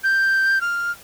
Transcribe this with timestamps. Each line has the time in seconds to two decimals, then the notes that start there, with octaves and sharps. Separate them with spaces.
0.04 G6
0.61 F6